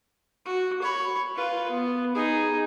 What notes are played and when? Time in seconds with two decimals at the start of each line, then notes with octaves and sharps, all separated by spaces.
0.46 F#4
0.82 C#5 B5
1.36 F4 B4
1.70 B3
2.15 D#4 G#4